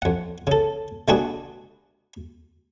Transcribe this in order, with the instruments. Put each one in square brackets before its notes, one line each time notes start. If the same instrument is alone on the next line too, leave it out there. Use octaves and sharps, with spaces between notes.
[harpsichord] F2 F#5
C#3 A4
C3 G#3 D4 F#4 G#4 B4